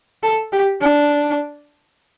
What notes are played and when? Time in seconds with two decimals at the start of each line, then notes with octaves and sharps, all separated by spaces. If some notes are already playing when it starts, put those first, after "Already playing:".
0.23 A4
0.52 G4
0.81 D4